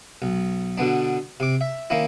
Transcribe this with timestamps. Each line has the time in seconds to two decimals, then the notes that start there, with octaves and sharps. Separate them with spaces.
0.22 B1
0.78 B2 D3 B3 D4
1.40 C3 D6
1.61 E5
1.90 D#3 A#3 C#4 E4